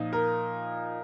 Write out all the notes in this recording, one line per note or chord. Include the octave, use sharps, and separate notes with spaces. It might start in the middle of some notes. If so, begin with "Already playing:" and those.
Already playing: A#2 F3 D#4
A#4